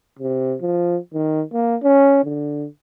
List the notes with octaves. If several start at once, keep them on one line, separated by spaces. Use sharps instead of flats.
C3
F3
D#3
A#3
C#4
D3